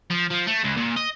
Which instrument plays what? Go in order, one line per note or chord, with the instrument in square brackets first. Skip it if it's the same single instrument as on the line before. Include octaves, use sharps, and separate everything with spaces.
[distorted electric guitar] F3
F3
A3
C#2
A#2
D#5